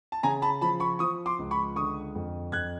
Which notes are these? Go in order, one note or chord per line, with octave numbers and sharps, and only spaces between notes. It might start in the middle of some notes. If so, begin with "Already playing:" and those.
A5
C#3 G#5 A#5
A5 B5
F3 A5 B5
B5 C#6
F3 C#6 D#6
C6 D6
C#2
B5 C#6
D3 C#6 D#6
F2
F2 F#6 G#6